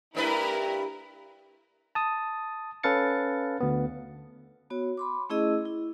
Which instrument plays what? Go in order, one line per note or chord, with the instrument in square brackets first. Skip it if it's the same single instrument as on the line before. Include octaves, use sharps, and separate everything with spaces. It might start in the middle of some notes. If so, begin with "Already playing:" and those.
[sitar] G2 A3 B4 [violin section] E4 A#4
[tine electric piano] A5 D#6
C#4 A4 B4 F5 A6 C#7
D2 B3
[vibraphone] B3 F#4 C#5
B5 C6 D6
A3 C#4 E4 G#4 D#5 E6
E4